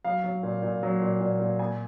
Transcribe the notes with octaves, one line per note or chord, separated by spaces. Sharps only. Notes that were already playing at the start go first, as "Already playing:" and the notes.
F#3 F5
F#3
A#2
A#2
F#3
A#2
A#2
A#2
A#3 G#5